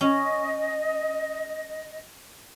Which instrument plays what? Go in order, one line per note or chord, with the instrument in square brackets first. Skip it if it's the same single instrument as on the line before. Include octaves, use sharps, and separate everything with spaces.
[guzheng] C#4 [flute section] D#5